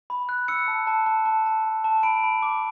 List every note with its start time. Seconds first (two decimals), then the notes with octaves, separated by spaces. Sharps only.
0.10 B5
0.29 F#6
0.48 E6 C#7
0.68 A5
0.87 A5
1.06 A5
1.25 A5
1.46 A5
1.64 A5
1.84 A5
2.03 B5 D7
2.24 B5
2.43 D6